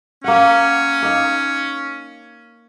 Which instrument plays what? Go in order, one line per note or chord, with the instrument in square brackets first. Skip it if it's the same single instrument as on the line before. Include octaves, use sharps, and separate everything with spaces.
[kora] A#3 F#5 [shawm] C#4
[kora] A#3 D#4